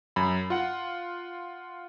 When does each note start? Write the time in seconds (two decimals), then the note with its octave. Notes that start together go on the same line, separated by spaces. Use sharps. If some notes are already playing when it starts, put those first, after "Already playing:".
0.16 F#2 B5
0.50 F4 F#5